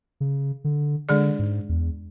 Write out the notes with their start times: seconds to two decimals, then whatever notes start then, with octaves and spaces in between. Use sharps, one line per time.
0.20 C#3
0.64 D3
1.09 D3 G#3 D4 G#4 D5
1.39 G#2
1.69 E2